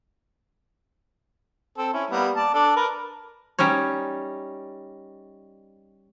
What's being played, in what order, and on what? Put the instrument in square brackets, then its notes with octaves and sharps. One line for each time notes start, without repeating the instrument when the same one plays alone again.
[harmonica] C4 A4
C#4 E4
G3 A#3 B3
D5 A5
D4 A4 D5
A#4 B4
[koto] G3 C#4 D#4 C#5